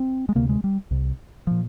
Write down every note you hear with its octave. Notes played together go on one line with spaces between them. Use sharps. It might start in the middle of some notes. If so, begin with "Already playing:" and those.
Already playing: C4
G#3
D2 C3 A#3
G#3
G3
C2 C3
A#2 F3